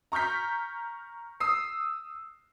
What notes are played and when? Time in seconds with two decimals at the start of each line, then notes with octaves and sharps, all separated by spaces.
0.12 A#5 C#6 F6 G6 B6
1.40 D#6 E6 C7